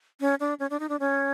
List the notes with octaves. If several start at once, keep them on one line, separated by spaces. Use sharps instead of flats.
C#4
D4
C#4
D4
D#4
D4
C#4